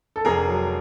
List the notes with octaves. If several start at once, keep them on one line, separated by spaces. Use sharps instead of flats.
A4
F1 G#4 A#4
F#3